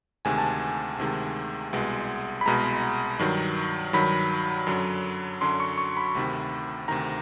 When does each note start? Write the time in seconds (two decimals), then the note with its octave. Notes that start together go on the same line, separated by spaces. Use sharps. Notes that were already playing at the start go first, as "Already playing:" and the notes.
0.25 D2 C3 D#3 G#3 G#5
0.38 A5
0.50 G#5
0.98 D2 C3 D#3 G#3
1.73 C2 B2 G#3
2.41 B5
2.46 C2 B2 G#3 A#5
3.19 G2 D#3 F#3
3.93 G2 D#3 F#3 B5
4.67 F#2 D3 F#3
5.41 F#2 D3 F#3 C6
5.60 C#6
5.78 C#6
5.97 B5
6.15 D2 C3 D#3
6.88 D2 C3 D#3 A#5